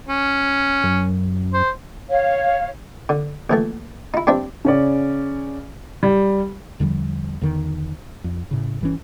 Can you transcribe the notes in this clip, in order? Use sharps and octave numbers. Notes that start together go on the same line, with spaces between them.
C#4
F#2
C5
C#5 F5
D3
A#1 E3 A3
D#4 E4
G2 C4 D4 E5
C#3 C#4 D5
G3
E2 D3 F3 G3
E2 D3 D#3
F2
A2 C#3
G1 E3 C#4